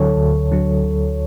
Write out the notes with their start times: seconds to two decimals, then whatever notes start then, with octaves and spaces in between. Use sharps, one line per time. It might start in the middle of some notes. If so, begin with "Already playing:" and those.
Already playing: D2 D3 F#3 A4 C#5
0.17 D2
0.52 D3 F#3
0.84 D2